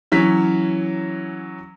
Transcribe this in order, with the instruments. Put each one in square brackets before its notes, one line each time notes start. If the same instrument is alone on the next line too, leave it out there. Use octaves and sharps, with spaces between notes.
[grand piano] E3 F#3 C#4 B6